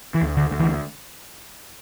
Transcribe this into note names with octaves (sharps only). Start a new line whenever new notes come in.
E3
D2
D3
D2
E3